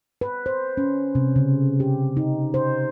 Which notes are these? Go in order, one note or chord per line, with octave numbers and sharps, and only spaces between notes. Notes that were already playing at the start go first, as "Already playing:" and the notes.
B4
C5
C#4
C3
C#3
G4
D#4
C5